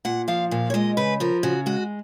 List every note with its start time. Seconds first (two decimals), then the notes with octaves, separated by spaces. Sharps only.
0.05 A#2 F#5
0.28 F3 F5
0.51 A#2 F5
0.70 C#5
0.74 G#3 D#5
0.97 C#3 B4
1.20 F3 A#4
1.43 C#3 F#4
1.66 G#3 F#4